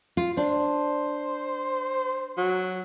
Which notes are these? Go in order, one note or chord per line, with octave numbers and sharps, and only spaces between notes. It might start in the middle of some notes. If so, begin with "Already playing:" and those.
F4
D4 C5
F#3